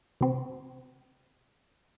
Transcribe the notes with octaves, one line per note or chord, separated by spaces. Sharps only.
C3 C4